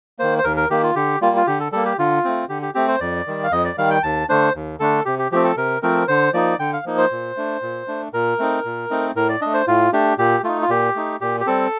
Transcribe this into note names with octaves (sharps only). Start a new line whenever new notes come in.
D#3 A#3 C5
C5
D#2 A#4
A#4
D#3 A#3 G4
F4
D3 G4
G3 A#3 F4
F4
D3 G4
A4
G3 A#3 A4
G4
D3 F4
A3 C4
D3 G4
G4
A3 C4 G4
C5
F2 D5
D#3 G3
F5
F2 D#5
D5
D#3 G3 F5
G5
D#2 A5
D3 A3 D4 C5
D#2
D3 A3 D4 A4
C3 G4
G4
F3 A3 C4 G4
A4
C3 A#4
F3 A3 C4 A#4
D3 C5
F3 A#3 D#4 D5
D3 G5
F5
F3 A#3 D#4
C5
A#2
A3 D4
A#2
A3 D4
A#2 A#4
A3 C4 D#4
A#2
A3 C4 D#4
A2 A#4
D5
A3 D4 D#5
C5
A2 F4
A3 D4 G4
A#2 G4
A3 D#4 F4
F4
A#2 G4
A3 D#4
A#2 G4
G4
G3 C4 A4